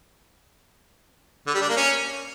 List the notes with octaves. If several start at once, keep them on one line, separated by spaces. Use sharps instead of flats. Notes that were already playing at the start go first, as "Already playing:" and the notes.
D3
G3
D4
A#3
C#4